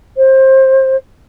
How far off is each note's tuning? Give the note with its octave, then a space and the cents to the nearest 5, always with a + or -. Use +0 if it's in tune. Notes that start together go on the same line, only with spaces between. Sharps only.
C5 +25